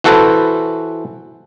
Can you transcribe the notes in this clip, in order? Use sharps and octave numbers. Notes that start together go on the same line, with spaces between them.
E3 F#4 A4 B4 C5